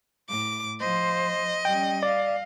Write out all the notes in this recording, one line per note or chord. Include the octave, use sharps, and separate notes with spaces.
A2 D6
F3 C5 D#5
G3 C#4 G5
D5 F5